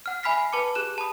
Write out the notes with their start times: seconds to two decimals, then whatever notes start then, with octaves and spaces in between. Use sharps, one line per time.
0.06 F#5 F6
0.23 E5 G#5 B5 F6 B6 C7
0.52 B4 A5 B5 D6 C#7
0.75 G4 G#4 F#6 E7
0.98 A5 B5 D#6